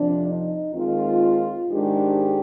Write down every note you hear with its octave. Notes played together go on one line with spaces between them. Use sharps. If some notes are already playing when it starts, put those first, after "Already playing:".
Already playing: F2 C3 F3 D4
D#4
D#2 D#3 G#3 C4 F4
G#2 D#3 G#3 D4 G4